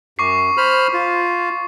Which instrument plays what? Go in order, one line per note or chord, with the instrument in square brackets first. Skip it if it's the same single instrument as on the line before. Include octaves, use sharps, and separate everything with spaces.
[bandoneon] F#2 [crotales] C#6 D6 C7
[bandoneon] C5 B5 F6
F4